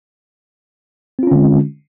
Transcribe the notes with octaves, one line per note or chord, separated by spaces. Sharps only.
D3 G#3 C4 C#4 F4